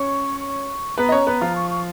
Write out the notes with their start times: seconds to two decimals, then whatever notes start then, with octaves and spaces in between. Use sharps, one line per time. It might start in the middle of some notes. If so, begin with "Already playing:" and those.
Already playing: C#4 C#5 C#6
0.40 C#6
0.98 B3 B4 A#5
1.09 D#5
1.12 C#4 C#5
1.27 B3 B4
1.41 F3 F4
1.56 C#6
1.70 C#6